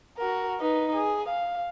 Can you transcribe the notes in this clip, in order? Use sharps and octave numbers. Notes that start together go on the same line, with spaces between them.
F#4 A#4
D#4 B4
G#4
F5